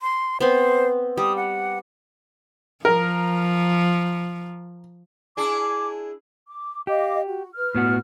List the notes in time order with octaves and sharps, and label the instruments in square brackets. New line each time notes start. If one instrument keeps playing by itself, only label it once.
[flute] C6
[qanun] B3 C4 [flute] C5
[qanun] G3 [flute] D#6
[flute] F#5
[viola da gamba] F3 [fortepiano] A#4
[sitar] D4 E4 G#4 [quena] D6
[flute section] D6
[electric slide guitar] G4 [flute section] D#5 F5 D6
[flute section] F#4
B4 F6
[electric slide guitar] A2 B3 F#4